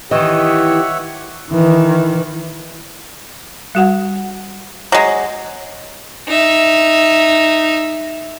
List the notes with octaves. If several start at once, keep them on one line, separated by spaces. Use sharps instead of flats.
D#3 E3 G4 C#5 D#5 E5 F#5
D#3 E3
G3 F#4 F#5
F#3 G#3
D#4 E5